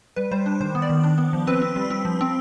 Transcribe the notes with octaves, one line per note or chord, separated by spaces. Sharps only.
G3 B4
G3 C5
D4
D#3 C5
B3
D5
D#3
D4
B3
F3
C4 B4
C4
G3
C4
F3
C4